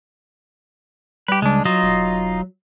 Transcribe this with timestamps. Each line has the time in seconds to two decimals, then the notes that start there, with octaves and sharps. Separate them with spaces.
1.28 G3 G4 B4
1.42 C#2 G#3 D4
1.65 F#3 D#4 F4 D#5
1.83 E1